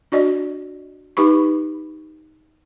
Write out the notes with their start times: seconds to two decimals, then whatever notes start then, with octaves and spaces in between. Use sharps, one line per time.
0.12 D4 F#4 D5 D#5
1.17 D#4 G4 B4 B5 C#6